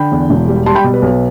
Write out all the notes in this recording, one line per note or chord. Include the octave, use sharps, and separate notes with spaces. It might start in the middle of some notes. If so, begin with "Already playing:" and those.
Already playing: D3 G5 B5
E2
E1
G3
G3 A5 C6
G5 B5
B2
B4
B1